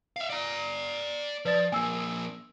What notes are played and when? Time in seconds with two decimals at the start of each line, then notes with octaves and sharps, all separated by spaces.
0.16 E5 F5
0.30 D5 A#5
1.45 F3 B4 D5 A6
1.72 F3 A#3 G#5 E6